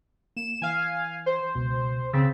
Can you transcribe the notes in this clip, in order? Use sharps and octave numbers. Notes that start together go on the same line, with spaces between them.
A#3 E7
E3 F5 G#5
C5
C#2 B2
C#3 C4 E6 A6 B6